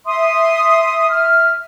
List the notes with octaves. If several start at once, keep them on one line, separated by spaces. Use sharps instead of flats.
E5 C6 D#6
E5 F6